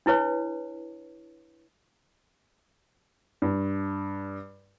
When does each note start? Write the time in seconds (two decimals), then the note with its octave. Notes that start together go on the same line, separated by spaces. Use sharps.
0.06 D4 E4 B4 C#5
3.42 G2